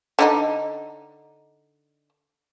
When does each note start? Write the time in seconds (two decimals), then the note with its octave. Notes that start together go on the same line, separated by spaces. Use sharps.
0.19 D3 D#4 D#5